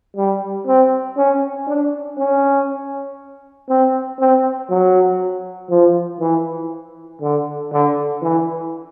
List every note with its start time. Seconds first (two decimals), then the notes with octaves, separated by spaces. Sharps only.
0.16 G3
0.67 C4
1.17 C#4
1.67 D4
2.17 C#4
3.69 C4
4.19 C4
4.70 F#3
5.70 F3
6.20 E3
7.21 D3
7.72 D3
8.22 E3